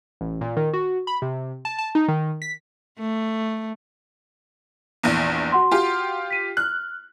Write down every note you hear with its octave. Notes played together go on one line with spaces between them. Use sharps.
A1
A#2
D#3
F#4
B5
C3
A5
A5
D#4
D#3
B6
A3
A#1 E2
F#4 F#5 C6
F4 G4
B6 D#7
F6 F#6